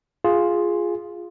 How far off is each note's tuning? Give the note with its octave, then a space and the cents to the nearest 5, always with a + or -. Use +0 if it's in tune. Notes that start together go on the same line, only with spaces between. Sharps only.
F4 +0 G#4 -5